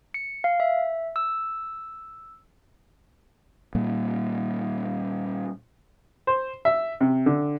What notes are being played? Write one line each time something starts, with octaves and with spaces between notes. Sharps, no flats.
C#7
F5
E5
E6
A#2 G3 A#3
C5
E5
C3
D3